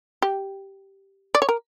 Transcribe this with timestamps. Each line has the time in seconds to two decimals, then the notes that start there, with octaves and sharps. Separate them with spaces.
0.22 G4
1.35 D5
1.42 C#5
1.49 A#4